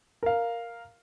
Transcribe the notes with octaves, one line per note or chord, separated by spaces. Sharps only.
A#4 F5